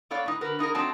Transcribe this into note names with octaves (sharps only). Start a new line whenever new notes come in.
B3 A4 C#5 D5 F5
A2 D#4 B4
D3 F#4 A#4 B4
B3 D#4 G#4 A#4
F#3 A3 C4 D4 D#4 A5